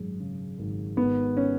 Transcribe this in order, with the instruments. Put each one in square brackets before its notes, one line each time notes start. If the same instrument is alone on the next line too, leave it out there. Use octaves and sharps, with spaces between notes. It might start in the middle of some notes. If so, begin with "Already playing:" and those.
Already playing: [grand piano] G#1 F#2 G#3
C#3
G#1
G#1 B3
C#4